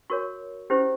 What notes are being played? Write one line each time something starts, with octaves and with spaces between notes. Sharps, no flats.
F#4 A#4 C#5 C#6
C#4 E4 G4 C5